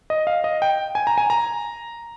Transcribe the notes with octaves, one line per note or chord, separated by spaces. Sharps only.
D#5
F5
D#5
G5
G#5
A#5
G#5
A#5